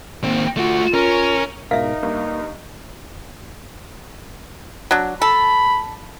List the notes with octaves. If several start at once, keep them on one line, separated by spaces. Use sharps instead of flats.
D#3 A#3 C4
A3 F4 F#4
C#4 A#4
G#2 B2 D#4 A#4 E5 F5
G2 A#3
F#3 D4
A4 B5